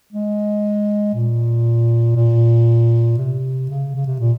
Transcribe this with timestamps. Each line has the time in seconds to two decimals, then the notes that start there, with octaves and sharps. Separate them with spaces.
0.12 G#3
1.14 A#2
2.16 A#2
3.18 C3
3.69 C#3
3.95 C#3
4.06 C3
4.20 A#2